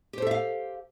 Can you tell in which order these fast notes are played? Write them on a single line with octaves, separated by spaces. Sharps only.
G4 C5 A4 E5 F5